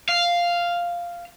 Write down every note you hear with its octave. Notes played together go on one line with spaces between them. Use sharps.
F5